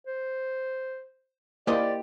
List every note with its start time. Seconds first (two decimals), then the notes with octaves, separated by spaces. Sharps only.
0.07 C5
1.67 A#3 E4 G4 C5 D5 D#5